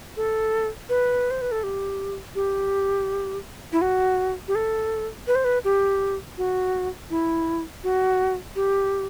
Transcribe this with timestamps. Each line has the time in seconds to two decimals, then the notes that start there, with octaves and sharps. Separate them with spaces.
0.17 A4
0.89 B4
1.31 C5
1.42 B4
1.52 A4
1.63 G4
2.35 G4
3.72 E4
3.81 F#4
4.48 G4
4.55 A4
5.27 B4
5.35 C5
5.45 B4
5.64 G4
6.38 F#4
7.10 E4
7.84 F#4
8.56 G4